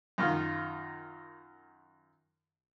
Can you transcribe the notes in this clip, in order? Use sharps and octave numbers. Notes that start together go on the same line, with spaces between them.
F#2 D#3 F4